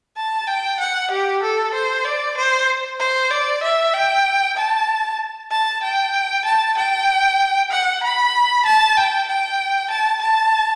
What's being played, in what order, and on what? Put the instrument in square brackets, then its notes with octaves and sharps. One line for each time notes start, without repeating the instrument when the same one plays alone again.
[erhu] A5
G5
F#5
G4
A4
C5
D5
C5
C5
D5
E5
G5
A5
A5
G5
A5
G5
F#5
B5
A5
G5
G5
A5
A5